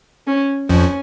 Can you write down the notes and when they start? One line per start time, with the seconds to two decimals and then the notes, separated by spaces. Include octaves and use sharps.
0.27 C#4
0.69 F2 F3 C#4